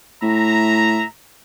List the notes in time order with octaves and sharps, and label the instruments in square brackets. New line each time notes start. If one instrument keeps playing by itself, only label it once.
[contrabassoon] A2 [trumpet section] E5 A#5